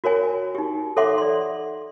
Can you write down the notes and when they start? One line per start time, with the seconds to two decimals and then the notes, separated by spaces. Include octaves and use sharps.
0.04 F#4 A#4 C#5 G#5
0.55 D#4 G4
0.97 A4 C#5 E5 F#5 C6 D6
1.18 D5 C6